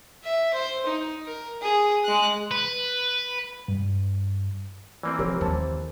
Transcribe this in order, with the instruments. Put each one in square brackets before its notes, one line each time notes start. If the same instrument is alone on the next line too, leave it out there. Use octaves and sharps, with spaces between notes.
[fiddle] E5
C5
D#4
A#4
G#4
G#3 F#6
[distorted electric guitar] B4
[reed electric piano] G2
[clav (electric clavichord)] E3 A#3 C4 [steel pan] D5
[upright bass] F3 [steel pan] G4 A#4 C#5
[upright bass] D#2 [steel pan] C5 A5